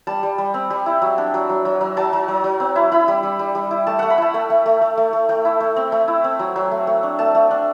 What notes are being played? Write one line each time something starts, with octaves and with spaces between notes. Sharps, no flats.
G3 A5
G3
G3
C4
G3
E4
F#3
D4
F#3
F#3
F#3
F#3
F#3 A5
F#3
F#3
F#3
C4
E4
E4 B5
G3
G3
G3
G3
E4
A3 A5
A3 F#5
B5
E4 A5
A3 G5
A3
A3
A3
A3
A3
A3 G5
E4
A3
C4
A3
E4
C4
F#3
F#3
A3
A3
D4
A3 A5
A3
D4